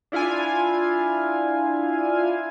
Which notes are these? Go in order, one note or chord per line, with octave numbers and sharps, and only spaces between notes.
D4 E4 F4 F5 G#5